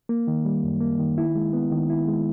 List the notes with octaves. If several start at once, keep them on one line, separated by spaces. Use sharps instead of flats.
A#3
D#3
G3
F#2
A#3
D#3
E4
G#3
B3
D#3
E4
G#3